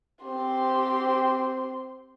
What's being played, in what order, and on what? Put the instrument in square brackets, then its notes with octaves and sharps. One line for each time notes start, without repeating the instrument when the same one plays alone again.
[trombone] C4 [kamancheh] G4 C6